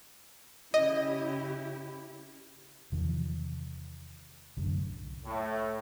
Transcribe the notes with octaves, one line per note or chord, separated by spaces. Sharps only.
C#3 E4 G4 D#5
E2 C3 D#3 F3
C2 F#2 A2 D3
A2